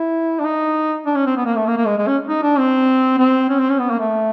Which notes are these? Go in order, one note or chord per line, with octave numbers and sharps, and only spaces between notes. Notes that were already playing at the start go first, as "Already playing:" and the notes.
Already playing: E4
D4
D#4
D4
C#4
C4
B3
A#3
A3
A#3
A#3
G#3
G#3
C#4
D#4
D4
C4
C4
C#4
C4
C#4
B3
A#3
A3